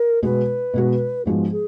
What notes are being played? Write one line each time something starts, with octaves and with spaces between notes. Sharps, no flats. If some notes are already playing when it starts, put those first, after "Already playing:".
Already playing: A#4
B2 G#3 B3 F#4 B4
B2 G#3 B3 F#4
G#2 F3 G#3 B3 F#4
G#4